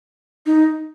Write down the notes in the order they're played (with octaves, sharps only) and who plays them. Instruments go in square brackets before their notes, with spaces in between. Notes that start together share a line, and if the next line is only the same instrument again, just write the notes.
[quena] D#4